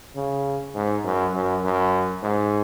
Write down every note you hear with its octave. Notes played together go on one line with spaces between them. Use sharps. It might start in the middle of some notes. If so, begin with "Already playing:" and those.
C#3
G#2
F#2
F#2
F#2
G#2